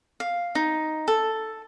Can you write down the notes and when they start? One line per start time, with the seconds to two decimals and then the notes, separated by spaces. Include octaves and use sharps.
0.20 F5
0.55 D#4
1.08 A4